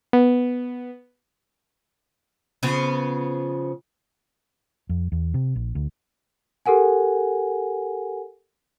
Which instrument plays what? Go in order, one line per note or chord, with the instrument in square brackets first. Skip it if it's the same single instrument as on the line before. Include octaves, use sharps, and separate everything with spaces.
[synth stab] B3
[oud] C#3 F3 B3
[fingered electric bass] F2
E2
C3
A#1
D2
[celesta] G4 A4 A#4 F#5 G#5